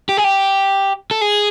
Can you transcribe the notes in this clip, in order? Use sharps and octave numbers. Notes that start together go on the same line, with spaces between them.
G4
G#4
G4
A4
G#4